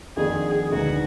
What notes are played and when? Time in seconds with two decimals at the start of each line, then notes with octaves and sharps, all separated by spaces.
0.17 F2 D#3 A#3 D4 F#4 G#4
0.72 D2 D3 G#3 B3 D#4 F#4